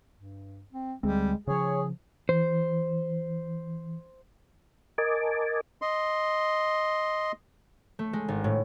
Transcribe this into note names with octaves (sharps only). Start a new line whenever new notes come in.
G2
C4
D2 G3 G#3 C4
C#3 F3 G#4 C#5
E3 C5
A#4 D#5 G#5 A5 D6
D#5 C6
A3
G#3
G#1
A2